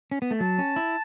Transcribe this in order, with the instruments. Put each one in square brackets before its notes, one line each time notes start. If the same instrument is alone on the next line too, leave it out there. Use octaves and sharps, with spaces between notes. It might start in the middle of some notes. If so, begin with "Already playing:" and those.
[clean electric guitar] C#4
B3
A3
[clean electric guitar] F#3 [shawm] A5
[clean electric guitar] C#4
E4